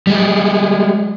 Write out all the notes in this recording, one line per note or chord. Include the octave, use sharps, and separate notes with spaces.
G3 G#3